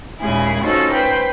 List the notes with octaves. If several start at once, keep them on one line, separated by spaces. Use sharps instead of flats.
D#2 A#2 C#3 G#3 E4 G#4
C#4 D#4 F4 F#4 A4 C5
B4 C5 G5